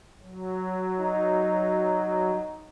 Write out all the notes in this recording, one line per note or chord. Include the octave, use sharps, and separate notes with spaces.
F#3
D#4